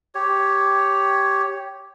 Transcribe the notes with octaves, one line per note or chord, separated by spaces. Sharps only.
G4 C#5